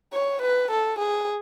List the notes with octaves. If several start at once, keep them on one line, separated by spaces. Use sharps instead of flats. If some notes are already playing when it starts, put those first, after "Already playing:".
C#5
B4
A4
G#4